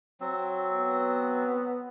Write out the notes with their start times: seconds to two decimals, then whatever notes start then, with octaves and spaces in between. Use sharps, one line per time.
0.20 F#3 C4
0.71 B3